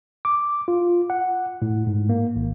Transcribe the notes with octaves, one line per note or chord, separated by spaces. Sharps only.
D6
F4
F#5
A2
G#2
A#3
G#1